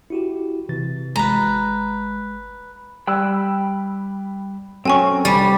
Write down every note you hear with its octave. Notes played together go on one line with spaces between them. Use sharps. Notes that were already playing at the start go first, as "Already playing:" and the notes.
E4 F#4 G4
C3 E3 A6
G#1 G#3 B4 A#5
G3 G5 B5 E6 F#6
F#3 C4 C#4 A4 G5 G#5 C#6
C2 G3 B5 D6